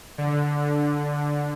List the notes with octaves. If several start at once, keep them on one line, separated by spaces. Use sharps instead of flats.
D3